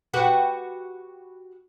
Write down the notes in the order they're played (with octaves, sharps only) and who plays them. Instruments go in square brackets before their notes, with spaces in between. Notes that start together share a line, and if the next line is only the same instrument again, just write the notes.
[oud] F#4 G4 B4